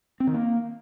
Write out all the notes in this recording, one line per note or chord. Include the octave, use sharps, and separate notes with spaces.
C4
D#3
A#3